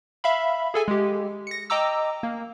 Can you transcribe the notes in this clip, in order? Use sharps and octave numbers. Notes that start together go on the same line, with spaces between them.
E5 F5 B5
G#4 A4 G#5
G#3 G4
A#6 C#7
D#5 G5 A#5 D6 E6
A#3